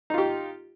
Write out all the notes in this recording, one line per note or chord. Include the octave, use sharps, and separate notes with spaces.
D#4 F4 G4